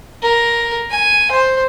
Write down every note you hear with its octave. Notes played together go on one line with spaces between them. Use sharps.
A#4
G#5
C5